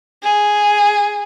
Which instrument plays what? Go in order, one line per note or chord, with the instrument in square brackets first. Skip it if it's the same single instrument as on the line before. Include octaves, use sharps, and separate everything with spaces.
[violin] G#4